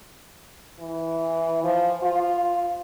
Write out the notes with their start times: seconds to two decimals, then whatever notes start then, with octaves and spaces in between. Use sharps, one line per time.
0.79 E3
1.64 F3
2.02 F4